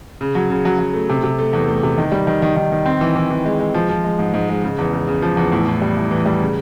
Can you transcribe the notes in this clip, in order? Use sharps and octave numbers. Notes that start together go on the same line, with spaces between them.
C#3
F#3
C#3
F#3
F#3
A3
C3
C3
A3
E2
A3
C3
D#3
G3
D#3
D#3
D#3
D#3
C4
E3
E3
E3
G#3
G#3
F3
F3
G#3
G#2
G#2
G#3
C#3
E2
C#3
C#3
F3
E2
A2
A2
G3
A2
E3
G3
C#3